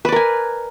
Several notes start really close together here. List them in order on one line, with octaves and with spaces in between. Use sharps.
B4 D5 A#4 G#5